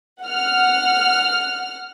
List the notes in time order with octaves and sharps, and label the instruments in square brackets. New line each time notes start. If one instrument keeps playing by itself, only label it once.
[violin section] F#5 F6